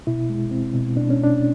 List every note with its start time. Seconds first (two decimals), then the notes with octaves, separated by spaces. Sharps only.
0.07 B2 E4
0.30 G#3
0.51 C4
0.74 B2
0.96 B2 D4
1.10 C#4
1.19 B2 D4